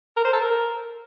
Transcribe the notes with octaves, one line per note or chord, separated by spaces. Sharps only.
A#4
C5
A4
A#4